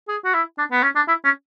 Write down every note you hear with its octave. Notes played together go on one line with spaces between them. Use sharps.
G#4
F#4
E4
D4
B3
C#4
D4
E4
C#4